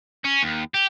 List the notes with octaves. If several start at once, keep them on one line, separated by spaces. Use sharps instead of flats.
C#4
D#2
G4